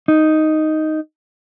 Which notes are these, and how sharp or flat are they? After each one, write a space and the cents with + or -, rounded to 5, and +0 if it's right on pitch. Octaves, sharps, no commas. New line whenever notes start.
D#4 +0